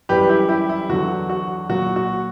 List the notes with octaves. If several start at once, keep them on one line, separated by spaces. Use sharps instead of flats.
F#2 E3 G3 G4 B4
E4 G4
E4 G4
E4
E2 D3 F#3 F#4
F#4
A#2 F#3 F#4
F#4